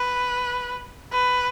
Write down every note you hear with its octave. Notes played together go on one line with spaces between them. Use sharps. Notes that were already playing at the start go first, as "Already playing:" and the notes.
Already playing: B4
B4